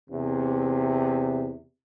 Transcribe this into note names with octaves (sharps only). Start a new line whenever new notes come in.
E2 C3